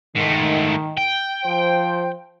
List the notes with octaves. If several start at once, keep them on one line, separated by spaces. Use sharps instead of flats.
G#2 D#3 A3
G5
F3 C5